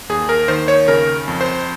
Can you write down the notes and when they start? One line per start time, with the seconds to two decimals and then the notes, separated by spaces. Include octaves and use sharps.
0.09 D#2 G#4
0.29 A#4
0.48 D#3 C5
0.68 C#5
0.88 C#3 A#4
1.28 F2
1.41 C5